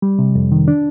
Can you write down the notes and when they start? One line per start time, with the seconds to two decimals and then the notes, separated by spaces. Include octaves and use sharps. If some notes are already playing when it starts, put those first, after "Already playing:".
0.02 G3
0.19 C3
0.35 F2
0.52 D#3
0.68 D4